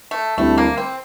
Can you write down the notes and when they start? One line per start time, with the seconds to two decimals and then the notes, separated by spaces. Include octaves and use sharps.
0.11 A3
0.38 D2 D3 G3 A3 C4 E4
0.58 A#3
0.78 C4